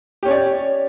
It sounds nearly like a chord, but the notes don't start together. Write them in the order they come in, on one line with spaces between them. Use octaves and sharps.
G4 C#4 C#5 D5